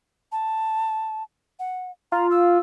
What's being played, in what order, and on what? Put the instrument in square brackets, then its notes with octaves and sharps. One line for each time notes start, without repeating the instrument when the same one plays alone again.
[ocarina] A5
F#5
[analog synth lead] F4 [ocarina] A#5
[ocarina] E6